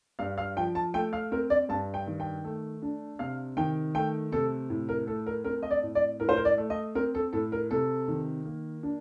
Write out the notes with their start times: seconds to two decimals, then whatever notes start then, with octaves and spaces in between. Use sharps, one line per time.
0.19 G2 F5
0.38 F5
0.56 F3 G5
0.75 A5
0.94 A3 G5
1.13 F5
1.32 C4 A#4
1.50 D5
1.69 G2 A5
1.94 G5
2.07 D#3
2.20 G5
2.44 A3
2.82 D4
3.19 C3 F5
3.57 D#3 G5
3.95 A3 G5
4.32 C3 A4
4.70 A2
4.89 A#4
5.07 A3 A4
5.26 A#4
5.44 C4 A#4
5.63 D#5
5.71 D5
5.83 A2
5.95 D5
6.20 A2 A#4
6.29 C5
6.37 A#4
6.45 D5
6.58 A3
6.70 D#5
6.95 C4 A#4
7.15 A4
7.33 A2 A4
7.52 A#4
7.71 C3 A4
8.08 D#3
8.45 A#3
8.83 D4